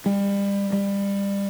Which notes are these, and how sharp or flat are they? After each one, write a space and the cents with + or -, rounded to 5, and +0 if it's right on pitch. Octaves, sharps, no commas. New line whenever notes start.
G3 +30
G3 +25